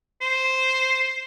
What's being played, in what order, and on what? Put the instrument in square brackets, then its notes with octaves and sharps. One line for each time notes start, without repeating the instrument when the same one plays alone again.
[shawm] C5